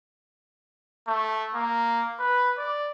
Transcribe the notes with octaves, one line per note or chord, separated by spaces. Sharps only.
A3
A#3
B4
D5